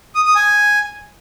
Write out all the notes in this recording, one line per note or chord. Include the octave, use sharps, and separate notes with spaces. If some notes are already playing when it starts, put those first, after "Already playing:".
D#6
D#6
G#5